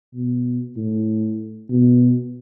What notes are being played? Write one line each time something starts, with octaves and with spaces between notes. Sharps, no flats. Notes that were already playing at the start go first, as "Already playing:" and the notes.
B2
A2
B2